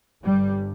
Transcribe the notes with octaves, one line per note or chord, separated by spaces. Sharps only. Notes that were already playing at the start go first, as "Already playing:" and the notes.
G1 G2 G3